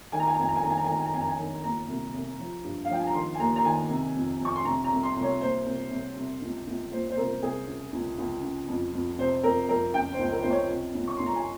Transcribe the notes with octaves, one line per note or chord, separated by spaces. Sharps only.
D#3 G#5
A#5
G#5
A#5
F2 G#5
A#5
G#5
D#3 A#5
G#5
A#5
G#5
D#3 A#5
G#5
A#5
F2 G#5
A#5
G#5
D#3
A#2 A#5
C2
C2
F3
G2
F5
F3 G5
G#5
A#5
D#3 C6
G#5
D#2 A#5
A#5
D#3 G#5
C3
F2
F2 C#6
C6
C3 A#5
A#5
C2
C6
C2
C#5
A#2 C5
C2
C2
C3
C#2
C#2
A#2 C5
C5
C2 A#4
C2 G#4
C#3
C#2
C#2
C#3
F2
F2
C3 C5
F2 A#4
F2 A#4
C#3 G5
C5
C#2
A#4
C#2 C5
C#5
C3
C#2
C#6
C#2 C6
A#5
G#5